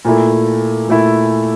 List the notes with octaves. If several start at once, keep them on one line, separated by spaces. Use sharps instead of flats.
A#2 A3 E4
A#2 A3 E4